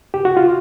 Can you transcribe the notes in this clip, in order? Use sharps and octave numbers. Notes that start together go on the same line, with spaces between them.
G4
F#4
F4